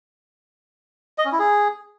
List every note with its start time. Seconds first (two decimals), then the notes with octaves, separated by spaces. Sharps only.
1.18 D#5
1.25 C#4
1.32 E4
1.39 G#4